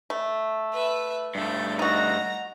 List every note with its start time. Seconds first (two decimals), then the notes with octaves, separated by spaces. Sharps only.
0.10 A3
0.73 B4 E5
1.35 G2 A3 G6 A6
1.79 D#4 F#4 A#5 A#6